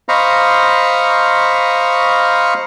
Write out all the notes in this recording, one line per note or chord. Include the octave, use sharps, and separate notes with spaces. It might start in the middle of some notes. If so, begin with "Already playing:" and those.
C5 D#5 F5 A#5 B5 C#6